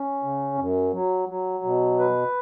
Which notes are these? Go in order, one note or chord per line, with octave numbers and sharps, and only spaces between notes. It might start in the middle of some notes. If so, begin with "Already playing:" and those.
Already playing: C#4
C#3
F#2
F#3
F#3
B2
B4